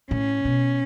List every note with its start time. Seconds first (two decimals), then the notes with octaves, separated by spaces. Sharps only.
0.11 A2 C#4
0.45 B2